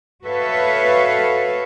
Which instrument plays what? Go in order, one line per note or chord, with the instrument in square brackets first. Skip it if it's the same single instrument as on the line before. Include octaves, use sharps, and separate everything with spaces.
[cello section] F#4 A4 B4 C#5 E5 F5